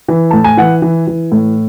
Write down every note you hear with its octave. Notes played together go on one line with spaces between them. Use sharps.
E3
A2 A5
G#5
E3 F#5
E3
E3
A2